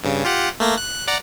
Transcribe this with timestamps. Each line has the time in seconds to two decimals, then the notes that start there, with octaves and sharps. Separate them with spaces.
0.04 G2 C#3
0.24 F4 G4 F#5
0.60 A3 A#3 A#6
0.78 F#6
1.08 D5 F#5 A#5